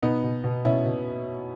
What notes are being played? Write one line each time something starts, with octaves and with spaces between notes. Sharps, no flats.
B2 B3 D#4
B2
B2
B2 C#4 E4
B2